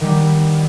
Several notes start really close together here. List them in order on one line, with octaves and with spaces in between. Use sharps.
D#3 G3 B3